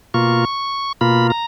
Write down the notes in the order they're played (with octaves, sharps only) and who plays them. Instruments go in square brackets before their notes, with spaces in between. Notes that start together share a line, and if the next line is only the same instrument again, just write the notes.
[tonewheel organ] B2 A#3 F4 C#6
B2 A#3 F4 B5
A#5